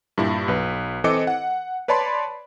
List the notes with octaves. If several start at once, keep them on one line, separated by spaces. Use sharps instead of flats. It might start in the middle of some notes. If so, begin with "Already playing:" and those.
G2 A#2 E4
B1 B4
E3 C4 A4 D#5 D6 C#7
F#5
B4 C#5 D5 A5 B5 C6